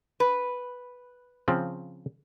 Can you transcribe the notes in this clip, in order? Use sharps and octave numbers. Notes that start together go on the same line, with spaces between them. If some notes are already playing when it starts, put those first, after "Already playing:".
B4
C#3 F3 C4